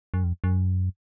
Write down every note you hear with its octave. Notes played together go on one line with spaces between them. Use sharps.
F#2
F2
F#2